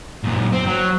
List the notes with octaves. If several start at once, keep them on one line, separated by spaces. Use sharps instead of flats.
F#2 A#2
C4
F#3